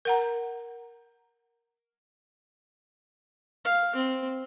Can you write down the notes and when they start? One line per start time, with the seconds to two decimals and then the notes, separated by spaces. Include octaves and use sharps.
0.05 A#4 F#5 A#5
3.65 F5
3.96 C4